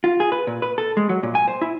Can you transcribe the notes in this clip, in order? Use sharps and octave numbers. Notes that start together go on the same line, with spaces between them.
F4
G#4
B4
A#2
B4
A4
G#3
F#3
A#2
G#5
C5
E4